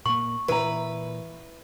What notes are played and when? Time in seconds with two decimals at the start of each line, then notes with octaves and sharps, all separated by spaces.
0.06 A#2 A#3 C#6
0.48 A#2 E3 E4 B4 A#5